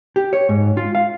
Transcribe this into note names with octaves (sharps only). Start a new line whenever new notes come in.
G4
C#5
G#2
F4
F5